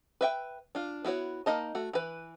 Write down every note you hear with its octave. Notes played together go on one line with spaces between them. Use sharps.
B4 E5 G5
D4 F4
B3 E4 F#4 C#5
A#3 D#4 D#5 A5
A3 F#4
E3 B4